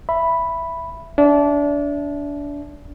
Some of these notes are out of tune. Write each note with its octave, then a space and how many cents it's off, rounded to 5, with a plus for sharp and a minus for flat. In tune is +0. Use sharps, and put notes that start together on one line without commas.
E5 +10 B5 +0
D4 -25 E5 -5